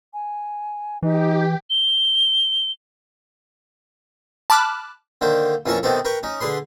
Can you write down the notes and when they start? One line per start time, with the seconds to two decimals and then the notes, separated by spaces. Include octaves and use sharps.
0.13 G#5
1.03 E3 D#4 G4
1.70 G7
4.50 A5 B5 D6 F6 F#6
5.21 D3 D#3 A#3 C5
5.66 F2 E3 A#3 C#4 A5 C#6
5.83 C3 D#3 B3 C4 A4
6.05 A#4 B4 G5 C#6
6.23 C#4 D#4
6.41 D3 G#4 B4 C6